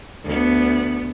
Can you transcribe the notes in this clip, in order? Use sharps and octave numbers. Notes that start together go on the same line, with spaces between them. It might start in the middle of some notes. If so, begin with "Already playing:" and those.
D2 B3